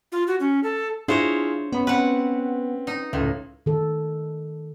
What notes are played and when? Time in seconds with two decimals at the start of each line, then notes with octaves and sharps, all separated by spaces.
0.12 F4
0.27 F#4
0.40 C#4
0.64 A4
1.08 D4 E4 F4 G#4 C5 C#5 A#5
1.72 B3 C#4 B5
1.87 C4 C#4 B4 F#5
2.87 D#4
3.13 C#2 A2
3.66 D#3 A4